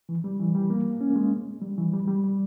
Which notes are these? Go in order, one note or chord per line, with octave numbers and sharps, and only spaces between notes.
E3
G3
E3
G3
A#3
C#4
A#3
G#3
G3
E3
G3
G3
G3